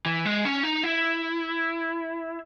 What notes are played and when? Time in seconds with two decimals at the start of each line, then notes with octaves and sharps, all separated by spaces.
0.06 E3
0.25 G#3
0.45 C#4
0.63 D#4
0.84 E4